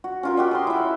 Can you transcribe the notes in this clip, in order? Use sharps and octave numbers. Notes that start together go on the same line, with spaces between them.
F#4
C#4 F4 A#4
F#4 G4 D#5
G#4 C5 C6
E4 E5